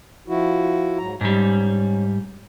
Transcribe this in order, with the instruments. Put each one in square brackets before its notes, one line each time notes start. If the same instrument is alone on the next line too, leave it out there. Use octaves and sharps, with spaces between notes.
[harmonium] F3 E4 F#4
G#2 F#3 A#5
[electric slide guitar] G#2 G3 [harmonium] C#4